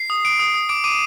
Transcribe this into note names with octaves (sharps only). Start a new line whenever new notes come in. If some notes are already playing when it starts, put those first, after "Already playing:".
Already playing: C7
D#6
D#6 D7
D#6
D#6
D6 D7
D6 D#7